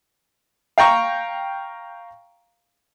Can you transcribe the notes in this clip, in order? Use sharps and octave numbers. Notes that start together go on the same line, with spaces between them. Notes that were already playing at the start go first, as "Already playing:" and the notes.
F5 G5 A#5 C#6